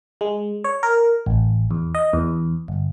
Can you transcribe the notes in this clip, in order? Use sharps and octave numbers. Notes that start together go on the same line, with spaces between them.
G#3
C#5
A#4
A1
E2
D#5
E2
G1